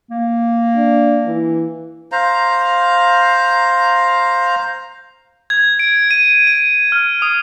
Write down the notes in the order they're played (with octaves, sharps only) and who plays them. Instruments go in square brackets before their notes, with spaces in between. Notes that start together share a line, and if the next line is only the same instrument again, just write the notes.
[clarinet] A#3
[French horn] D4
E3
[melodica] C5 F5 A#5
[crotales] G#6
D7
D#7
D#7
F6
D#6